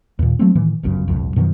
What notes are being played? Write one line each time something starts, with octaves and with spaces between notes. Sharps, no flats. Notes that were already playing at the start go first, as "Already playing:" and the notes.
D#2 A#2
F#3 A3 A#3 C4
A2 D#3 E3
G1 C#2 F#2 C#3
D#1 C2 F2
F#2 B2 D#3 F3